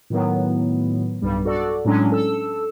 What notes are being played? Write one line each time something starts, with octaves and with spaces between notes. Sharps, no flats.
A2 D#3 F#3 B3
B1 G2 G3
F#4 A4 D5
A2 F#3 G#3 C#4 D4
A4 E6